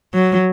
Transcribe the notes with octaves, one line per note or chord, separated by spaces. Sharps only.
F#3